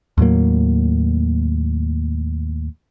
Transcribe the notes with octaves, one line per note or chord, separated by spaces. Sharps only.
D#2 A2 F#3 A#3